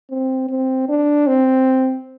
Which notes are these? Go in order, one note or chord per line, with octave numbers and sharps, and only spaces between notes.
C4
C4
D4
C4